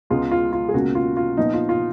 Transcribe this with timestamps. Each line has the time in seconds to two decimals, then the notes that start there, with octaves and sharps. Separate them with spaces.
0.10 C#2 C#3 G#3 B3 F4
0.31 F4
0.52 F4
0.69 G#4
0.74 C#2 B2 A#3 C#4 F#4
0.95 F4
1.17 F4
1.37 A#2 F3 B3 D#4
1.54 F4
1.69 F4